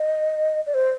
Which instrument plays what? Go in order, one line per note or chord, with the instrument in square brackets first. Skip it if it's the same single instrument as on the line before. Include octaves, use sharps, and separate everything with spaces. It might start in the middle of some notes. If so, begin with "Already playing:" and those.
Already playing: [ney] D#5
D5
C5